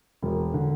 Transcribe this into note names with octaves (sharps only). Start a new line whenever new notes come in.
E1
D3